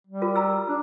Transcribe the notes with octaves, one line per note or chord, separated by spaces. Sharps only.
G3
F4 A#4
A#5 E6
D4